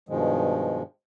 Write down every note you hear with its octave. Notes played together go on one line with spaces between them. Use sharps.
G2 B2 D#3 F3 G#3